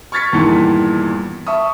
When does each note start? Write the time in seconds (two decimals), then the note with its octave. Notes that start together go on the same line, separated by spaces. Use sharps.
0.12 C#6 F6 G#6 A6 B6 C#7
0.32 E2 G2 A#2 D#3 E3
1.46 E5 A5 C#6 D#6